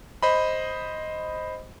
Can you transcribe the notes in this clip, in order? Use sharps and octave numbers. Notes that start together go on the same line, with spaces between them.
C5 D#5 B5